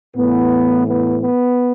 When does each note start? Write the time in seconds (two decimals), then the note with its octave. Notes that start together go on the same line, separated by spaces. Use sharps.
0.16 A2 E3 B3
0.87 B3
1.21 B3